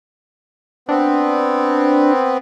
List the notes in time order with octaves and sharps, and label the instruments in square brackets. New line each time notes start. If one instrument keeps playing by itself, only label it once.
[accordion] B3 C4 [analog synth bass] D4